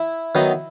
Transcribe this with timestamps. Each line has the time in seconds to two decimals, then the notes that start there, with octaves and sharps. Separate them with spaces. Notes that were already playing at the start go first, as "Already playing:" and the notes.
Already playing: E4
0.35 D#3 F#3 B3 D#4